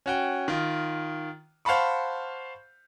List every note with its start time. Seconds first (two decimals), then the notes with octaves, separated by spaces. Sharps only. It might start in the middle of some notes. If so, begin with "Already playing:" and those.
0.06 C#4 F#4 G5
0.48 D#3 F4
1.65 C5 F5 F#5 A5 B5 C#6